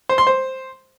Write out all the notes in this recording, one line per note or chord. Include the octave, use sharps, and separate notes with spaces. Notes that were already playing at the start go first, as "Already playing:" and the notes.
C5
C6
C5